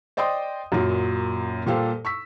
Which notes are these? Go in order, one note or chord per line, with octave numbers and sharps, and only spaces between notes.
C5 D5 D#5 G5 C6 D#6
F#2 A#2 F#3
A#2 G3 G4 A4 C5 F5
C#6 E6 B6